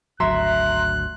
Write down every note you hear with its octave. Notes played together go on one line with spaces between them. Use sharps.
G#1 D2 F#3 E5 A#5 C6 F#6